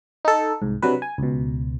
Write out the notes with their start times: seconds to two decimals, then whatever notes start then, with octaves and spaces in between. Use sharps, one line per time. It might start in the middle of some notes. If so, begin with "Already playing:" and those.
0.25 D#4 A4
0.62 C2 G#2
0.82 C3 F#3 D4 B4
1.02 G#5
1.18 C#2 B2